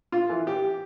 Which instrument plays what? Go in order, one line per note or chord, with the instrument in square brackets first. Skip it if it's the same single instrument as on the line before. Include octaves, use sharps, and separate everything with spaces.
[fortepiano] F4
E3
G4